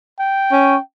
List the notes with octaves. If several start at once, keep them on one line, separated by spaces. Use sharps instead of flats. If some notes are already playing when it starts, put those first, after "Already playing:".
G5
C#4